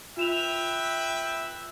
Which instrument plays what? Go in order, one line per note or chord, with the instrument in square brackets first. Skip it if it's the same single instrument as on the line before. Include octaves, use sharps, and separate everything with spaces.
[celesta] F4 E7 F7 [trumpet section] B4 E5 G5